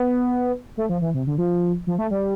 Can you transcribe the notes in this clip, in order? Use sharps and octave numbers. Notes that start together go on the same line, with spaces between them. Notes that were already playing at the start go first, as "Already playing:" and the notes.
Already playing: B3
A3
F3
E3
C3
D3
F3
F3
A3
G3